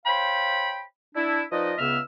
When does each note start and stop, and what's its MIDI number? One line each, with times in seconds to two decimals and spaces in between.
0.06 0.82 72
0.06 0.82 73
0.06 0.82 77
0.06 0.82 79
0.06 0.82 83
1.15 1.42 62
1.15 1.42 64
1.52 1.73 53
1.52 1.73 63
1.52 1.73 71
1.52 1.73 74
1.52 1.73 75
1.78 1.99 37
1.78 1.99 49
1.78 1.99 59
1.78 1.99 76
1.78 1.99 88
1.78 1.99 89